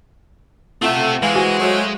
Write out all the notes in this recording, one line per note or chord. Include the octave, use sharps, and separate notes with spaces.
A3 C4 F4 E5 F#5 E7
E3 G#3 F5
F#4 C5 G#5
F#3 A3